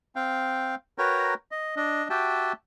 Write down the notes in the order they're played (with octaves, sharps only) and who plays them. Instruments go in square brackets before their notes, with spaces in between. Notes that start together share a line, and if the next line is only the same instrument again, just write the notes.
[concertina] C4 F5 G5
F#4 A#4 B4 C#5 G5 A#5
D#5
D4 D#5
F#4 G4 E5 G5 A5